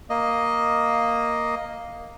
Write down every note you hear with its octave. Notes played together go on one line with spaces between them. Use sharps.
A#3 D#5